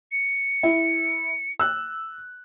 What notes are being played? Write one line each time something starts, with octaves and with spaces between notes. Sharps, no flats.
C#7
E4
E6 F#6